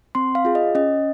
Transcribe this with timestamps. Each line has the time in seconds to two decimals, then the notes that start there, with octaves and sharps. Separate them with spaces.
0.15 C4 C6
0.35 F5
0.45 F4 G#4
0.55 D#5
0.75 C#4 D#5